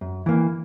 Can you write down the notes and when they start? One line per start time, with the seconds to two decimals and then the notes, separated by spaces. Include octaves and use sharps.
0.01 F#2
0.26 E3 A#3